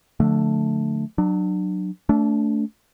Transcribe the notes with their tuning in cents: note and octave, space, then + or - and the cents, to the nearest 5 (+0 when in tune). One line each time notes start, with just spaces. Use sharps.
D3 +0 F3 +45 A3 +0
F#3 +0 D4 +30
A3 +0 D4 -30